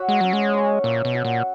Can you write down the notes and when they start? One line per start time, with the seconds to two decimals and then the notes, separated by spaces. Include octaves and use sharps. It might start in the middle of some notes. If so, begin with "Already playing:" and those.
Already playing: F#4 C#5 E5
0.08 G#3
0.21 F#3 C#4
0.33 G#3
0.54 C#5
0.84 A#2 E5
1.05 B2
1.14 F#4
1.25 A#2